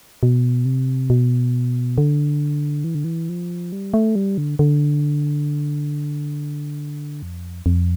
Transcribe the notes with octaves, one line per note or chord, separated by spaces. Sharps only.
B2
C3
B2
D3
E3
D3
E3
F3
G3
A3
G3
D3
D3
F2
F2